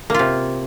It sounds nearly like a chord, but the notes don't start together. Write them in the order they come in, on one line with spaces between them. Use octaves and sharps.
A#3 F4 C3